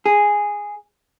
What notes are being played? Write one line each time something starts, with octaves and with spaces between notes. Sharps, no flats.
G#4